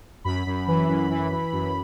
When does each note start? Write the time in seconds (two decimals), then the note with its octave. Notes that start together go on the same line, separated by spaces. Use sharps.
0.24 F#2 B5
0.47 F#2
0.68 E3
0.89 F#2
1.10 E3
1.31 E3
1.53 F#2